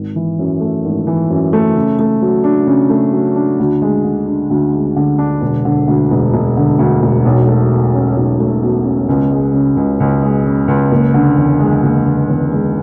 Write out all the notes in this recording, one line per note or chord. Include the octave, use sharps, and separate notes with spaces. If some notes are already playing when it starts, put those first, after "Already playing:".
Already playing: G#1
E3
F#2
A3
G#1
E3
F#2
A3
C#3
A3
F#3
D4
C#3
A3
F#3
D4
D2
G#3
D3
D4
D2
G#3
D3
D4
E1
D3
D2
E1
E1
D3
D2
E1
B1
A3
B2
C#4
B1
A3
B2
C#4
C#2
G#3
C#3
C#2
C#2
G#3
C#3
C#2
F#1
D3
E2
G#3
F#1
D3
E2
G#3